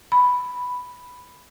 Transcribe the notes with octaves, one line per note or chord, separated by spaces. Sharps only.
B5